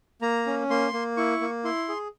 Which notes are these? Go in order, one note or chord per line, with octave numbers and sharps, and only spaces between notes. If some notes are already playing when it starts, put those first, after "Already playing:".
A#3 A#5
C#4
A#3 C6
A#3
E4 C#6
A#3
E4 C6
G#4